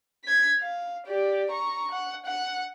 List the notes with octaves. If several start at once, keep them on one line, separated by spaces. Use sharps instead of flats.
G#6 B6
F5
G4 D5
A#5 C#6
F#5
F#5